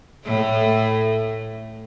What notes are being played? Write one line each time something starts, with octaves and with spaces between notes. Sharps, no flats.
A2 A3